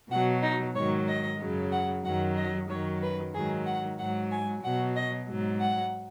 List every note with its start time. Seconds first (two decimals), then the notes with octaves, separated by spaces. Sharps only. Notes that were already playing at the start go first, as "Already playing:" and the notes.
0.11 B2 F#3 F#5
0.42 D#4
0.75 G#2 D#3 F#3 C#5
1.07 D#5
1.40 F#2 C#3 F#3
1.72 F#5
2.05 F#2 D#3 F#3 F#5
2.37 D#5
2.69 F#2 D#3 F#3 C#5
3.02 B4
3.34 G#2 D#3 F#3 G#4
3.66 F#5
3.98 G#2 F#3 F#5
4.31 G#5
4.63 B2 F#3 F#5
4.96 D#5
5.28 G#2 F#3
5.60 F#5